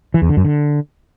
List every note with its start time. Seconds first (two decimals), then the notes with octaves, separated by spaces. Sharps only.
0.14 E3
0.22 E2
0.29 D3
0.37 F#2
0.44 D3